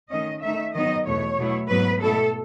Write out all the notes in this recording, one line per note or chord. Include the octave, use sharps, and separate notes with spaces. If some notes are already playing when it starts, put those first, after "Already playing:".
D#3 A3 C#4 D#5
D#3 A3 D#4 E5
D#3 F#3 B3 D#4 D#5
E2 B2 A3 C#5
B2 F#3 A3 E4
G#2 F#3 B3 B4
B2 A3 E4 A4